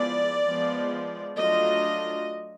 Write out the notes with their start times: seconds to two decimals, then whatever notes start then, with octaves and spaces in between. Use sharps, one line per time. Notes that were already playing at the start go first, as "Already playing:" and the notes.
Already playing: F3 G#3 B3 E4 D5
0.46 F3 G#3 B3
1.38 F#3 A3 D4 F4 D#5